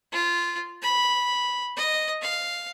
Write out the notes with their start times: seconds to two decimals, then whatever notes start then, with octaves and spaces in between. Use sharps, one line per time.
0.12 F4
0.82 B5
1.77 D#5
2.22 F5